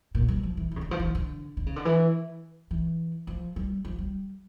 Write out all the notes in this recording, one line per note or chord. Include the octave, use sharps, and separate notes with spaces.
A#2
G3
F3
E3
E3
C#3
D3
F3
E3
D3
D3
C#3
D3
E3
E3
F3
G3
F3
G3